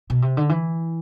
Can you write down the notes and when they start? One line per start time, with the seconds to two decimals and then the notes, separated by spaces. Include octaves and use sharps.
0.10 B2
0.22 C3
0.37 D3
0.49 E3